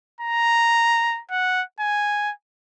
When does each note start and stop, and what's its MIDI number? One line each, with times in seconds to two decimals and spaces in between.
0.20 1.21 82
1.31 1.63 78
1.80 2.32 80